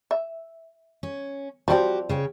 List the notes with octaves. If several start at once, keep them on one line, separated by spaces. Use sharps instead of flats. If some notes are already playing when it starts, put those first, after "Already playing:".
E5
C#4
F3 G3 C4 F#4 G4
C#3 C#5 G5